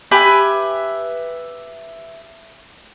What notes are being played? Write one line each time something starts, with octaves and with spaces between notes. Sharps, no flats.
G4 B4 E5 G#5